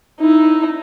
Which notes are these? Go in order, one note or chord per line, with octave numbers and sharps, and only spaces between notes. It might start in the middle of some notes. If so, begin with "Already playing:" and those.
D#4 E4